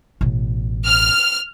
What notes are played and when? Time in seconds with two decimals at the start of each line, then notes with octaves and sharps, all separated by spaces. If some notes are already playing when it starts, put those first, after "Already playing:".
0.21 A1 B2
0.87 F6